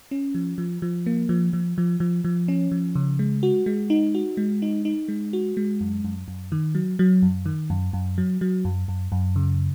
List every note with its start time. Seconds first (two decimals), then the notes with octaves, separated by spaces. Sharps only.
0.11 C#4
0.35 F3
0.58 F3
0.82 F3
1.06 A#3
1.29 F3
1.53 F3
1.78 F3
2.00 F3
2.25 F3
2.48 C#4
2.72 F3
2.95 C#3
3.19 G#3
3.43 F#4
3.66 G#3
3.90 D#4
4.15 F#4
4.37 G#3
4.62 D#4
4.85 D#4
5.08 G#3
5.33 F#4
5.57 G#3
5.81 F#2
6.04 F#2
6.28 F#2
6.52 D#3
6.75 F#3
6.99 F#3
7.22 F#2
7.46 D#3
7.70 F#2
7.93 F#2
8.18 F#3
8.41 F#3
8.65 F#2
8.88 F#2
9.12 F#2
9.36 C#3